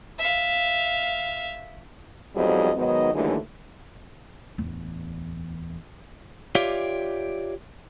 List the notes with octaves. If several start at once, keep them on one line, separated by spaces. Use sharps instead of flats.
E5 F5
F2 G#2 F#3 G3 B3 D#5
G#2 D#3 F#3 B3 D#5
D#2 D3 E3 F#3 G#3 A3
D1 E2
F4 G4 C#5 D5 E5 F5